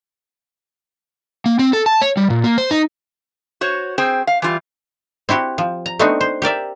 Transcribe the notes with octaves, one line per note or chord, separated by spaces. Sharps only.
A#3
C4
A4
A5
C#5
G3
A#2
A#3
C5
D#4
F#4 C5 C#5
C4 G#4 C5 G5
F5
E3 G3 F4
C4 E4 F#4 G4
F3
A#5
A3 B3 C4 D4 D#4 F#4
C5
G4 A#4 D5 E5